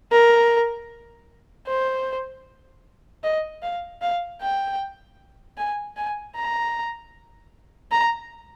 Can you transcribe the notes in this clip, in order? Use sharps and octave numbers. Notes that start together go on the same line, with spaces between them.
A#4
C5
D#5
F5
F5
G5
G#5
G#5
A#5
A#5